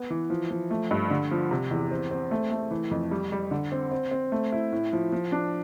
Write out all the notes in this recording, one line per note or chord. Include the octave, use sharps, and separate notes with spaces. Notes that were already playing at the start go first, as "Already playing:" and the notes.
Already playing: B3
E3
F3
F3
A3
G2
D3
F3
C3
E2
C4
C4
A3
A3
E3
F2
G3
G3
D3
C4
C4
C4
A3
E4
A2
F3
F3
D4